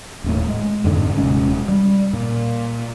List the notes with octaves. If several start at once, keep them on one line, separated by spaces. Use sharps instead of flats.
D#1 D#2 A2
G#3
F2 G#2 D3 C4
D#1 C3 G#3 C#4
G3
A#2